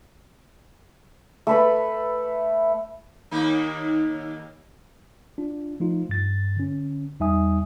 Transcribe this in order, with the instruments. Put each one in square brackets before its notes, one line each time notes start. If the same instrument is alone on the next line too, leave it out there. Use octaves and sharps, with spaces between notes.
[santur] A3 B4 B5
[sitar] D#2 A#3 D#4
[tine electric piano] D4 F4
F3 A3 D#4 F4
G2 A6
D3 C#4
E2 G3 D#4 E5 G#5 D#6